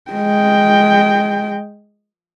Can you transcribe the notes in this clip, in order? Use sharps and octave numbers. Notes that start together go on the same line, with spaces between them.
G#3 G5